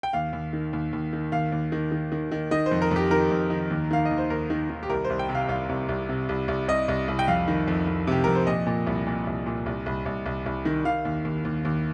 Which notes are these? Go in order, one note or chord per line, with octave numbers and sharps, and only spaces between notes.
G5
D#2 F5
D#2
D#3
D#2
D#2
D#3
D#2 F5
D#2
D#3
D#3
D#3
D#3
D#3 D#5
C5
F2
A#4
F2 G4
D#3 A#4
F2
D#3
D#2
D#3 F5
D#5
D#2
C5
D#2 A#4
D#3
D#3
G4
C2 A#4
C5
C2
G5
C3
F5
C2 F5
C2
C2
C3
C2
C2
C2 D#5
C2
C2
G5
F2 F5
D#3
F2
F2
C3 G4
F2 A#4
C5
A#2 D#5
A#2
C2
A#2
C2
A#2
C2
C2
C2
C2
C2
D#3
D#3 F5
D#2
D#2
D#2
D#2